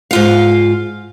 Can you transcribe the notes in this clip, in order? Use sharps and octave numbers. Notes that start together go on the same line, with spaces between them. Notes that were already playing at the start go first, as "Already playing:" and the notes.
G#2 F4 F5